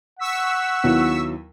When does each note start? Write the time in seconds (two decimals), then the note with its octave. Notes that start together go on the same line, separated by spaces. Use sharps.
0.19 F#5 C#6 E6 B6
0.84 D#2 F#3 B3 E4